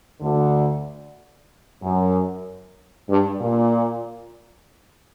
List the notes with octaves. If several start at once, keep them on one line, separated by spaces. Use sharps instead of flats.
D2 D3
F#2
G2
A#2